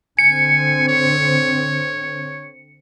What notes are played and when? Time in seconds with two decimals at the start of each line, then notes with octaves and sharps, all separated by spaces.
0.19 D3 C4 G#5 C#7
0.88 C#5